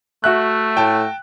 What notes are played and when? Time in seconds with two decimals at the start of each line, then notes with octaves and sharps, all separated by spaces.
0.24 A3 F#4 E5 F#6
0.77 A2 G5 A5